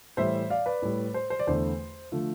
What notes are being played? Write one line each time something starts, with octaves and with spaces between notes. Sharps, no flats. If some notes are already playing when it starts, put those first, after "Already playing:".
A2 E3 G3 C5 E5
D5 F5
B4 D5
A2 G3
C5
C5
D5
E2 D3 A3 C5
D3 F3 A3